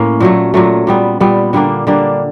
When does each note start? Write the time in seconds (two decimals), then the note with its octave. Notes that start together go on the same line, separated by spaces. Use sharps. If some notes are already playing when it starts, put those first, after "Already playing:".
Already playing: A2 A#3 C#4
0.20 A#2 F#3 A3
0.54 A#2 F#3 A3
0.87 A#2 G3 B3
1.20 A#2 G3 B3
1.53 D3 G3 A#3 D4
1.87 D3 G3 A#3 D4